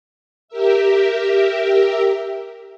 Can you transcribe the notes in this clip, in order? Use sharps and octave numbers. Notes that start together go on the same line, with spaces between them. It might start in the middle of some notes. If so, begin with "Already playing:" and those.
G4 A#4 E5